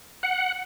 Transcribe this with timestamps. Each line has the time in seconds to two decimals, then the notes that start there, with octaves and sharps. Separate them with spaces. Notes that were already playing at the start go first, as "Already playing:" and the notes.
0.23 F#5